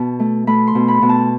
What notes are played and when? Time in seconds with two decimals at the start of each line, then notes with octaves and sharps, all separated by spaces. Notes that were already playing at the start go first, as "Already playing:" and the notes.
Already playing: B2 A5
0.20 A3
0.47 A3 B5
0.67 C6
0.75 B2
0.88 B5
1.02 B2
1.09 A5